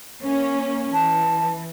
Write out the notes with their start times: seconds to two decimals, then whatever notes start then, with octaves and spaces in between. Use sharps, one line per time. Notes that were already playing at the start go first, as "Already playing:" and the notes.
0.24 A#3 C#4
0.93 E3 A5